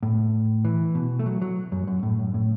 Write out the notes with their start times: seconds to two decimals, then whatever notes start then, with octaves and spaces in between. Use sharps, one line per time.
0.03 A2
0.65 E3
0.95 B2
1.19 A3
1.26 F#3
1.42 F#3
1.72 F#2
1.87 F#2
2.03 A2
2.19 F#2
2.34 A2